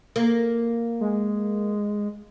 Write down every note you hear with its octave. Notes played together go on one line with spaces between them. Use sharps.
A#3
G#3